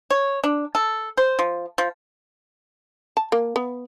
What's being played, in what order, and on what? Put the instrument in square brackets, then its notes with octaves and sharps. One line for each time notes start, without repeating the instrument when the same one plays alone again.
[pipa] C#5
D4
A4
C5
F3
F3
[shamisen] A5
A#3
B3